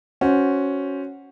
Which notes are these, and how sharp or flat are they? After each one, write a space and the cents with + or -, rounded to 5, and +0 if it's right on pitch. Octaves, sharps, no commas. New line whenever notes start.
C#4 +0 F#4 +0 C5 +0